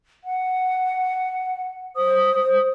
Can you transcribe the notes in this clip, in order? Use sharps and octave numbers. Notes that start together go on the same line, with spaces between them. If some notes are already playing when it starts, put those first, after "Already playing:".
F#5
C5 D#6